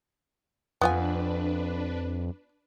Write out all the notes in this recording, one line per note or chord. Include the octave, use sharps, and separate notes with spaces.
F2 B3 D4 F4 B4 G#5